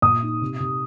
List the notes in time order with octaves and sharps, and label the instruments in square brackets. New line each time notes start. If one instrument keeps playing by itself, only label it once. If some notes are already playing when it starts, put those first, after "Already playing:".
[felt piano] A#2 [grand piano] D#6
[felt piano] D#4
C3
C3